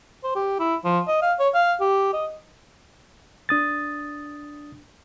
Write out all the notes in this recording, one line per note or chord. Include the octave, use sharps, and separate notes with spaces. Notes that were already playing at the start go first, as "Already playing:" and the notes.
C5
G4
E4
F3
D#5
F5
C#5
F5
G4
D#5
D4 D#6 A6